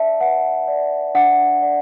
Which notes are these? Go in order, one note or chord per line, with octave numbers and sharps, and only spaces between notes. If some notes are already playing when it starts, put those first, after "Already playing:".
Already playing: D4 D5 E5 A5
B4 F#5
D5
D4 F#5
D5